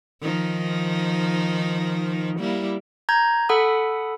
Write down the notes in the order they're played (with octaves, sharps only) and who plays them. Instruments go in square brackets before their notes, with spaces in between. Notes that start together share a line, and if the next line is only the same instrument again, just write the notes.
[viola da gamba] D#3 F3 D#4
G3 A#3 E4
[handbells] A#5 G6 G#6
A4 F#5 B5 D#6